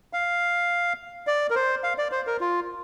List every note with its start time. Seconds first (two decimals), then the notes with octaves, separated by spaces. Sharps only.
0.13 F5
1.27 D5
1.50 A#4
1.55 C5
1.84 F5
1.98 D5
2.12 C5
2.27 A#4
2.40 F4